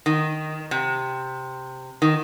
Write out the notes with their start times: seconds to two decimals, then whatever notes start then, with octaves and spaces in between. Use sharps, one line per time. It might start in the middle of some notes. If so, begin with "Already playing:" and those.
0.06 D#3
0.71 C3
2.02 D#3